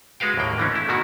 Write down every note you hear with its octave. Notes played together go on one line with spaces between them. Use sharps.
G#3 F#4 B4 F5 G5
D#2 A2 A#3 G5
D3 E3 C4 C#4
A3 E4
B2 D#3 E4 F#4